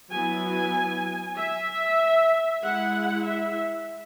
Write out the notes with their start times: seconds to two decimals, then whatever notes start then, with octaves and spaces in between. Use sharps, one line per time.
0.11 F#3 B3 E4 G#5
1.36 E5
2.63 G#3 E4 F#5
3.26 E5